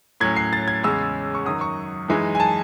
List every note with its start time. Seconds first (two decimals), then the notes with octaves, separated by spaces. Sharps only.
0.20 A2 F#3 C#4 G#6
0.36 C7
0.53 A6
0.68 G#6
0.83 E2 C#3 G#3 C#4 E6
1.35 C#6
1.46 F#2 D#3 F#3 D#6
1.61 C#6
2.08 F#2 E3 G#3 D#4
2.35 G#5
2.40 A5